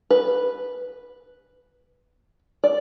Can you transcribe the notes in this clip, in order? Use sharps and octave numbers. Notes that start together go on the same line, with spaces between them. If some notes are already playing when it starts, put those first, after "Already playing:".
B4
D5